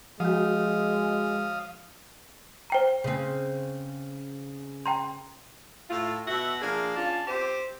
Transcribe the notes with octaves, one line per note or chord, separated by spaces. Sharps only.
F3 G#3 F#4 F5 D#6
C5 G5 A#5
C#3 C4
G5 A#5 C6
A2 A3 F4
B2 F#4 E5
F3 A#3 D4 G#4
C#4 D4 F4
C4 G4 C5